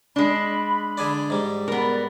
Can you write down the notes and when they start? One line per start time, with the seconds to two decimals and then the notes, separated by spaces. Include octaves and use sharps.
0.16 G#3 D4 B5
0.98 D3 G#4 D5
1.30 G#2 G3
1.68 B3 A#4 D5 B5